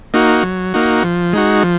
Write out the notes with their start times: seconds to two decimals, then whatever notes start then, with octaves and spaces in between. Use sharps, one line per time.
0.14 A#3 D#4 F#4
0.43 F#3
0.74 A#3 D#4 F#4
1.04 F3
1.33 G#3 D#4 F#4
1.63 F3